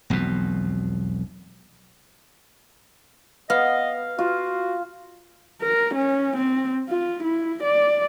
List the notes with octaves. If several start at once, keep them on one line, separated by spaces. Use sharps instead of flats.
E1 B1 F2 B2
B3 D#5 F5
F4 F#4
A#4
C#4
C4
F4
E4
D5